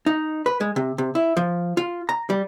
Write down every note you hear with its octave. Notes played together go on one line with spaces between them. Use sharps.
D#4
B4
G#3
C3
C3
E4
F3
F4
A#5
G3